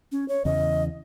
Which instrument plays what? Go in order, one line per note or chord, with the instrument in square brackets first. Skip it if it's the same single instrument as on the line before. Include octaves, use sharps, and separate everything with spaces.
[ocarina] C#4
C#5
[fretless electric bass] E2 C#3 E3 [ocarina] D#5